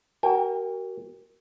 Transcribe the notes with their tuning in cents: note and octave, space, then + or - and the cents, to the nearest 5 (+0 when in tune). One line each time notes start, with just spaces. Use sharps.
F#4 +40 A#4 +0 G5 +45